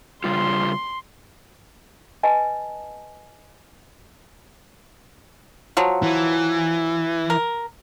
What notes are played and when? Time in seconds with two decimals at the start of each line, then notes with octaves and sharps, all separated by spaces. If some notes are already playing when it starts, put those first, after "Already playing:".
0.24 C#3 G3 F4 C6
2.23 B4 D#5 G#5 A5
5.77 F3 F#3
6.03 E3
7.30 A#4